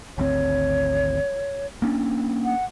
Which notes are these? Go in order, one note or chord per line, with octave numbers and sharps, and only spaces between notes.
G#1 D2 C4 C#5
A#3 C#4 D4
F#5